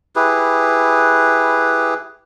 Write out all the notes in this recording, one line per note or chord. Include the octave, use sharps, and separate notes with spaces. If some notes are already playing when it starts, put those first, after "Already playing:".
E4 G4 G#4 B4